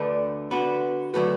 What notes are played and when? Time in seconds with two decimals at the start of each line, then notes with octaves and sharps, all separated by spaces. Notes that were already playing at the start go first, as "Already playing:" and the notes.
Already playing: D2 D3 A3 D4 B4
0.51 D3 B3 F#4 B4
1.14 D3 F#3 A3 F#4 B4